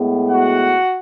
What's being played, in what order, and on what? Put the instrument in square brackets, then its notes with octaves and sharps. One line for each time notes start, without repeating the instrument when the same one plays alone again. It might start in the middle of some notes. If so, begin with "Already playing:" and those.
Already playing: [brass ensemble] A2 G#3 B3
F#4 F#5